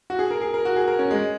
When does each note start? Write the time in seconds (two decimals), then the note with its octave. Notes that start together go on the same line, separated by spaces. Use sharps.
0.10 F#4
0.19 G#4
0.31 A#4
0.41 G#4
0.54 A#4
0.65 F#4
0.76 G#4
0.88 A#4
0.99 C#4
1.11 G#3